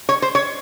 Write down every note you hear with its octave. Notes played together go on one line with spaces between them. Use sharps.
C#5
C5
C#5